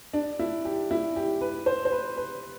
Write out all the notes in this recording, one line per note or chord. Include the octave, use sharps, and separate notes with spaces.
D4
E4
G4
E4
G4
B4
C5
C5
B4
B4